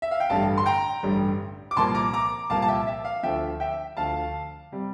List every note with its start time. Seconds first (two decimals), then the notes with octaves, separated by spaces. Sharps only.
0.02 E5
0.11 F5
0.20 G5
0.30 A1 G2 D3 G3 F5 A5
0.58 C6
0.66 G5 A#5
1.03 A1 G2 D3 G3
1.71 D6
1.77 C2 A#2 F3 A#3 A5 C6
1.95 A#5 D6
2.13 A#5 D6
2.50 C2 A#2 F3 A#3 F5 A5
2.62 A5
2.68 E5 G5
2.87 E5
3.05 F5
3.23 D2 D3 F3 E5 G5
3.60 E5 G5
3.97 D2 D3 F3 F5 A5
4.72 C3 G3